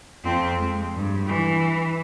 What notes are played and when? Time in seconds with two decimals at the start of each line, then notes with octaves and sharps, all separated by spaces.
0.24 F2 C4
0.57 G#3
0.94 G2
1.26 E3